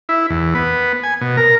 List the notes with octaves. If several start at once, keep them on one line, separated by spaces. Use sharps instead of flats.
E4
E2
B3
G#5
B2
A#4